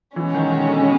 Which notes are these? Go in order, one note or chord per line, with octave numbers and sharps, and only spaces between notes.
B2 E3 G#3 C#4 F#4
D#3
D#3
D3
C#3